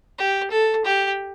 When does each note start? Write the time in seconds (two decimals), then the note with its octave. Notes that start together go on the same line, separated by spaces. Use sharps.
0.19 G4
0.51 A4
0.85 G4